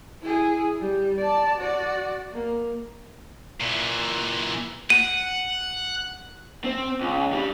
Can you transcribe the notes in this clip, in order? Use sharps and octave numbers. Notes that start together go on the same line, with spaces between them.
E4 G#4
G3
D5 A5
F#4 D5
A#3
A#2 E3
F#5 D#7
C4
C#2
G2 G3